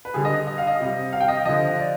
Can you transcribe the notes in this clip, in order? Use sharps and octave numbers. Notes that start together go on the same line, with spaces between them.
B4
D3 G3 G#4
D#5
D#5
F5
D#5
C3 G3
F5
G5
D#5
D3 F3 D#5
D5